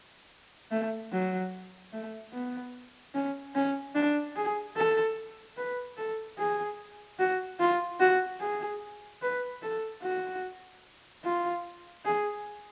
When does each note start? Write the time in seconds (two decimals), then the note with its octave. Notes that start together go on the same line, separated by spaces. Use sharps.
0.71 A3
1.12 F#3
1.93 A3
2.33 B3
3.14 C#4
3.55 C#4
3.95 D4
4.36 G#4
4.76 A4
5.57 B4
5.97 A4
6.38 G#4
7.19 F#4
7.60 F4
8.00 F#4
8.41 G#4
9.22 B4
9.63 A4
10.02 F#4
11.24 F4
12.05 G#4